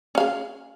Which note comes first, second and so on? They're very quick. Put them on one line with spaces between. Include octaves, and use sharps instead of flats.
C#4 F5 G#4